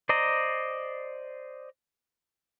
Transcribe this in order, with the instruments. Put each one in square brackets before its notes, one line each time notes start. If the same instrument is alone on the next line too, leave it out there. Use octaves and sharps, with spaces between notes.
[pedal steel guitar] C5 D5 D#5 A#5